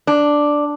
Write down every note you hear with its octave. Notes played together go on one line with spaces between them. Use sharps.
D4